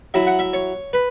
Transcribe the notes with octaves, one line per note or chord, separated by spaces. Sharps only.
F#3 E4 E5
F#5
E5
C#5
B4